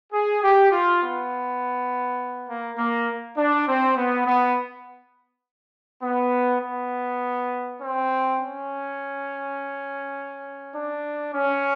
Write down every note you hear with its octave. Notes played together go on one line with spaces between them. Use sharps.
G#4
G4
F4
B3
A#3
A#3
D4
C4
B3
B3
B3
B3
C4
C#4
D4
C#4